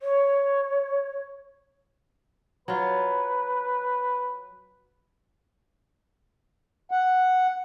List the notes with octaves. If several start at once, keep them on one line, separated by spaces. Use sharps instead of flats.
C#5
F#3 F4 B4
F#5